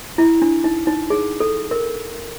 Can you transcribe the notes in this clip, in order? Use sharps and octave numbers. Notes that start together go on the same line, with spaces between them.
E4
D4
D#4
D#4
G#4
A4
A#4